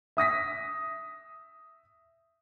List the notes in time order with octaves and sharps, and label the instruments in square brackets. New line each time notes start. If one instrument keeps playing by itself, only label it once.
[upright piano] E5 D#6 A#6 B6